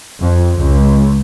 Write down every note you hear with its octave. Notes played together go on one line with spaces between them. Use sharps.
F2
C#2